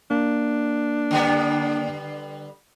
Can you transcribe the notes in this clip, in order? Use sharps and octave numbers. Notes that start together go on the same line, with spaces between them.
A#3 D4
D3 G3 B3